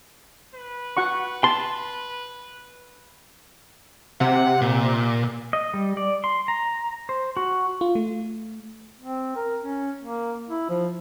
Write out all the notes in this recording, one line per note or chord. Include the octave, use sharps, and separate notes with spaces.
B4
F#4 F#5 C#6
A5 C6
C3 F#5
A#2
D#5
G3
D5
C6
A#5
C5
F#4
F4
A3
C4
A#4
C#4
A#3
E4
F3